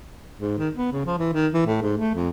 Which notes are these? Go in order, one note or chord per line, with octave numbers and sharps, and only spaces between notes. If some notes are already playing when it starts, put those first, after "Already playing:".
G#2
D#3
B3
C#3
F3
E3
D#3
E3
A2
G#2
A3
F2